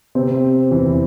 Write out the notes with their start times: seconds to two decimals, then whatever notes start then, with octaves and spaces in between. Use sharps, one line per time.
0.15 C3 C4
0.71 E2 E3